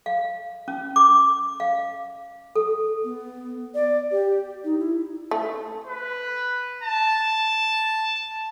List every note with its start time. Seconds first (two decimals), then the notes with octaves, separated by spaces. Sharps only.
0.06 F5
0.68 C#4
0.96 D6
1.60 F5
2.56 A4
3.04 B3
3.75 D5
4.11 G4
4.64 D#4
4.79 E4
5.31 A3
5.87 B4
6.83 A5